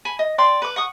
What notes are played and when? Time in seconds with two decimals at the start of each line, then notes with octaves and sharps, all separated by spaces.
0.05 G#5 B5
0.19 D#5
0.38 D5 G5 C6
0.62 B4 D6
0.76 F#5 C#6 D#6